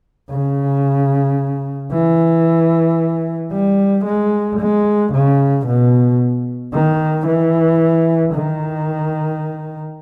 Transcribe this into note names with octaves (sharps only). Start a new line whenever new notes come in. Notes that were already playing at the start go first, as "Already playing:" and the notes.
C#3
E3
G3
G#3
G#3
C#3
B2
D#3
E3
D#3